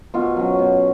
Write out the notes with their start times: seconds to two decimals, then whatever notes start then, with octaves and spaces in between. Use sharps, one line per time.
0.14 B2 F4
0.37 F#3 C#4
0.59 B2